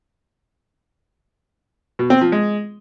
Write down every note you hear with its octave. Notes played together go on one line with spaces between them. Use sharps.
B2
C4
F3
G#3